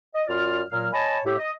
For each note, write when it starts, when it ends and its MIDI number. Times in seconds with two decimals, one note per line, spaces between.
0.15 0.23 75
0.28 0.62 42
0.28 0.62 65
0.28 0.62 74
0.28 0.62 89
0.71 0.88 46
0.71 0.88 54
0.71 0.88 89
0.93 1.19 73
0.93 1.19 75
0.93 1.19 80
0.93 1.19 81
0.93 1.19 83
1.24 1.36 45
1.24 1.36 67
1.24 1.36 76
1.38 1.51 75